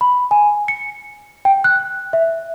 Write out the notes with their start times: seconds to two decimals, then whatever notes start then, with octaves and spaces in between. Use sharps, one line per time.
0.01 B5
0.31 G#5
0.68 C#7
1.45 G5
1.64 F#6
2.13 E5